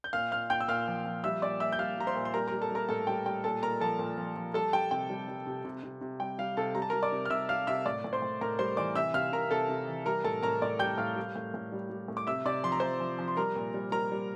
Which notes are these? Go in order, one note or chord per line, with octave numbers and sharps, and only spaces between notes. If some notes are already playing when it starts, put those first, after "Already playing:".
G6
A#2 F5 F6
A#2 F5 F6
A#2 G5 G6
E6
A#2 F5 F6
F3
F3
G3 E5 E6
A#2 D5 D6
A#2 E5 E6
G6
G3 F5 F6
G3 A#5
C5 C6
A#2
C6
G3 A#4 A#5
G3 A#4 A#5
A4 A5
G3 A#4 A#5
A2 A4 A5
G3 G5
G3 G5
A#2 A4 A5
A#2 A#4 A#5
F3 A4 A5
A#2
F3
F3
G3 A4 A5
G3 G5
C3 G5
G3
G3
C3
C3
C3
C3
G3 G5
G3 F5
C3 A4 A5
G3 A#5
A5
G3 A#4 A#5
D5 D6
C3
F6
C3 E5 E6
G3 F5 F6
C3 E5 E6
A2 D5 D6
A2
C5 C6
A2
A2 A#4 A#5
G3 C5 C6
E3 D5 D6
C3 E5 E6
C3 F5 F6
C3 A#4 A#5
C3 A4 A5
C3
E3
G3 A#4 A#5
A2 A4 A5
A2 A#4 A#5
A2 D5 D6
G3 G5 G6
A2 F5 F6
G3
A2
A2
G3
G3
A2
D6
C3 E5 E6
C3 D5 D6
F3 C6
A#5
F3 C5 C6
F3
F3
C6
G3 A#4 A#5
A#2
G3
G3 A#4 A#5
G3